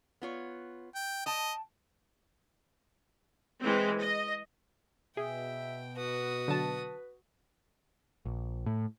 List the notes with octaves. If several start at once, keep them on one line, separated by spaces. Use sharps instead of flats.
B3 F4 C#5
G5
D#5 G5 A5
E3 G#3 C4
D#5
B2 G#4 E5 G5
F#4 B4 D#6
D3 F#3 A5
A#1
A2